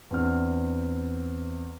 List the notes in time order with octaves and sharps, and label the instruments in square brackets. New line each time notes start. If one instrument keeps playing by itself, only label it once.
[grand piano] E2 C4 D4 F#5 F6